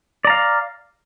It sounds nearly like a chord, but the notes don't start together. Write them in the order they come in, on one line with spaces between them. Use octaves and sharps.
D5 A#5 F5